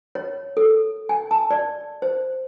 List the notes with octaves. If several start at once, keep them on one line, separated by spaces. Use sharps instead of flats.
C#5
A4
G#5
A5
D5
C5